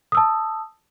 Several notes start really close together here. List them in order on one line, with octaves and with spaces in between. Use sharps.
D#6 E6 A5